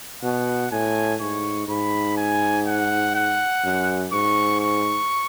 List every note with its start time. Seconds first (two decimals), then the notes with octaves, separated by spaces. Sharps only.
0.23 B2 F#5
0.71 A2 G#5
1.21 G#2 C#6
1.68 G#2 B5
2.17 G#5
2.66 F#5
3.15 F#5
3.64 F#2
4.12 G#2 C#6
4.60 C#6